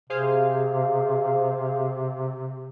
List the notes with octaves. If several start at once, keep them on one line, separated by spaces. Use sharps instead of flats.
C3 G#4 C5 F5